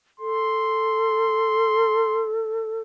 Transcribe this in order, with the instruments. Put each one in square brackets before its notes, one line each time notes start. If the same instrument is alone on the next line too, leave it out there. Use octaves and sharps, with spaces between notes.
[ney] A4 [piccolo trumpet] C6